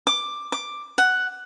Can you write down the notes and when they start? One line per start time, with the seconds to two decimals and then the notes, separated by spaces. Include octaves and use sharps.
0.07 D6
0.52 D6
0.98 F#5